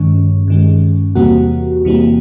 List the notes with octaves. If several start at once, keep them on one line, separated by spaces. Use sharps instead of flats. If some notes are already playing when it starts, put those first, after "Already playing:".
Already playing: G2 D#3 G#3 C#4
G2 D#3 G#3
E2 C3 E3 G3 A#3 F#4
E2 C3 E3 G3 A#3